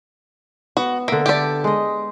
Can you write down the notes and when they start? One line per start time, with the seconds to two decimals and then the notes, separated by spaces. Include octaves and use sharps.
0.77 B3 F#4
1.08 D3 A#3 E5
1.26 G4 A4 D5 E5
1.64 G#3 D#5